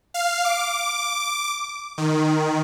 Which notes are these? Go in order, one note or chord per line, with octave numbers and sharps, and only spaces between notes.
F5
D6
D#3